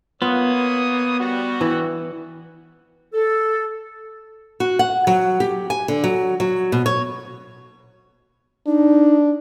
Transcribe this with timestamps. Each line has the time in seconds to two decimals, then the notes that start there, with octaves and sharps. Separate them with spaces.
0.22 A#3 B3 F4 C#5 F#5 D#6
1.19 G3 F#4
1.61 E3
3.14 A4
4.60 F#4
4.79 F#5
5.07 F#3
5.40 G4
5.70 G#5
5.88 D3
6.04 F#3
6.40 F#3
6.72 B2
6.86 C#5
8.67 D4 D#4